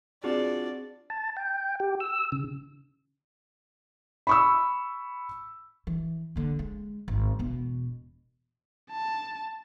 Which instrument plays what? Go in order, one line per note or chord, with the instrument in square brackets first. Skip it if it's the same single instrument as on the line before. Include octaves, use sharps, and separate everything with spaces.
[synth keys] C4 G#4 [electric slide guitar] D4 F4 F#4 [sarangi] D5
[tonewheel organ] A5
G5
G4
E6
C#3
[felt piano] B5 C#6 E6
[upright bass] E3
D3 A#3
G#3
G#1
E1 B2
[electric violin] A5